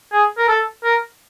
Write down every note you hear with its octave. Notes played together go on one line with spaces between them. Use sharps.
G#4
A#4
A4
A#4